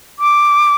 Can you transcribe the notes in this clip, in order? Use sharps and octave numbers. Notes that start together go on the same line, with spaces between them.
D6